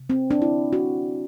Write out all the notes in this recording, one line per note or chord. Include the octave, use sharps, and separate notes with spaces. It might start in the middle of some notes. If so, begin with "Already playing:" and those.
Already playing: C3
C4
D4
E4
F#4